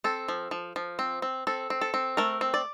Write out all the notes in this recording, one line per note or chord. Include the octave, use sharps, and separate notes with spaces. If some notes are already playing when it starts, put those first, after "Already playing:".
C4 A4
F3
F3
F3
C4
C4
C4 A4
C4
A4
C4
A3 A#4
C4
D5